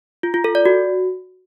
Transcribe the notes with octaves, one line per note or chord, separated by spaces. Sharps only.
F4
F4
A4
D5
F#4